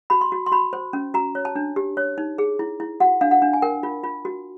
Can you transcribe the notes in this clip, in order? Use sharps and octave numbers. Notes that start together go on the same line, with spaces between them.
F#4 B5
C6
F#4
C6
F#4 B5
C5
C#4
F#4 A#5
C#5
A5
D4
G4
C#5
D#4
G#4
E4
E4
F#4 F#5
D4 F5
F#5
D4
G#5
A#4 G5
F4
F4
F#4